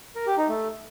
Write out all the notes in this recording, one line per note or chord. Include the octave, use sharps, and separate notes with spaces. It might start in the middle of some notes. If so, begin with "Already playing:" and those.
A#4
G4
D#4
A3